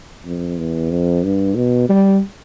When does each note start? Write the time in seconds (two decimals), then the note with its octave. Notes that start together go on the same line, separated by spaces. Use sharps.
0.25 F2
0.58 E2
0.91 F2
1.24 G2
1.56 B2
1.89 G3